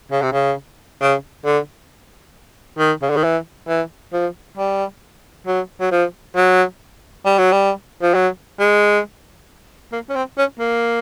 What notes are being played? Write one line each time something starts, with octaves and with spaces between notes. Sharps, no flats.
C#3
C3
C#3
C#3
D3
D#3
C#3
D3
D#3
E3
E3
F3
G3
F#3
F#3
F3
F#3
G3
F#3
G3
F3
F#3
G#3
A#3
C#4
C4
C#4
A#3